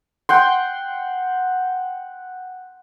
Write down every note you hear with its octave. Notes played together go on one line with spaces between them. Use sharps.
F#5 G5 C6